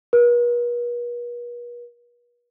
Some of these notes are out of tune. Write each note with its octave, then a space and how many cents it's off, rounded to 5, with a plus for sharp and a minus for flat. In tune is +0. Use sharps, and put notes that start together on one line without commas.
B4 -45